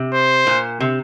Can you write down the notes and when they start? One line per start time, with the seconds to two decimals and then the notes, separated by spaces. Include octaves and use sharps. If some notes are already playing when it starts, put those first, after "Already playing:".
Already playing: C3
0.14 C5
0.47 A#2
0.80 C3